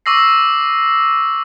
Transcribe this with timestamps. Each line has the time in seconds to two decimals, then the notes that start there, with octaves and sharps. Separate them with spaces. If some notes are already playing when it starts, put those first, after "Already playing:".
0.06 C#6 D6 E6 A#6 C7